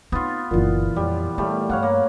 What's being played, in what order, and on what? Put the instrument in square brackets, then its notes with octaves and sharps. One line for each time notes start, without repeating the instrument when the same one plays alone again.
[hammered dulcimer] B3 F4 [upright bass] C4 D#4
[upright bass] F#1 D3 [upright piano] A#2 E3
[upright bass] F2 [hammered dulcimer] G3
[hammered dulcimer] G3 A3 [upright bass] B3
[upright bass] G2 [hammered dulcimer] C#5 F5 F#5
[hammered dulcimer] A#3